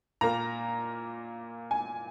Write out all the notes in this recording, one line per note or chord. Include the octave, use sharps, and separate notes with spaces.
A#2 A#3 A#5
G#5